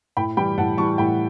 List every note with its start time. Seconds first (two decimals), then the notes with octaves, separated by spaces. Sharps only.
0.17 A2 G5 B5
0.37 E3 G3 G5 B5
0.58 A2 F#5 A5
0.77 E3 G3 A5 C#6
0.98 A2 G5 B5